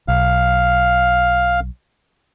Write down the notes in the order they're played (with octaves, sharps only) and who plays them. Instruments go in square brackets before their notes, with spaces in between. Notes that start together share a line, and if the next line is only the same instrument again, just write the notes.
[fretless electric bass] B1 [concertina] F5